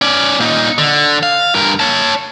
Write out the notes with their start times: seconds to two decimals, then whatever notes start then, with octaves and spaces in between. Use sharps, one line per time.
0.02 C#4 D5
0.40 A#2 D#4
0.78 D3
1.23 F5
1.55 G2 A#4
1.80 C#5 A5